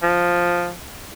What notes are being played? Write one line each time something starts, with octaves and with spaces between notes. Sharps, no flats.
F3